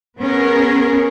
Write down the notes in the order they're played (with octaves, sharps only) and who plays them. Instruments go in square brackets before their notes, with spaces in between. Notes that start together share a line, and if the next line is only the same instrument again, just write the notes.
[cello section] B3 C#4 G#4 A#4